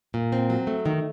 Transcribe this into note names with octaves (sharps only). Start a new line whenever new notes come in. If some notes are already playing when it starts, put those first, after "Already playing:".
A#2
C4
F#3
A3
D#3